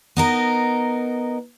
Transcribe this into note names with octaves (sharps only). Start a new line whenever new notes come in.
B3 D#4 A#4